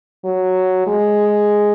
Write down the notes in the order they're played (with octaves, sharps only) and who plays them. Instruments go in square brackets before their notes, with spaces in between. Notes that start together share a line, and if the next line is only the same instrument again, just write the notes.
[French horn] F#3
G#3